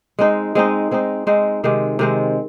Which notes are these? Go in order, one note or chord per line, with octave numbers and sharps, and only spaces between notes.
G#3 C4 D#4
G#3 C4 D#4
G#3 C4 D#4
G#3 C4 D#4
C3 D#3 G#3 C4
C3 D#3 G#3 C4